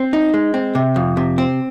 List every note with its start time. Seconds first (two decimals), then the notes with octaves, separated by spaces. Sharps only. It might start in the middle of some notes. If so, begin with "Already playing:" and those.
Already playing: C4
0.13 D#4
0.34 G#3
0.54 C4
0.75 C3
0.96 F2
1.17 C3
1.38 C4